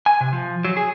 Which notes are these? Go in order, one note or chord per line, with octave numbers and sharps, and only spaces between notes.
G#5
C3
F3
F#3
G#4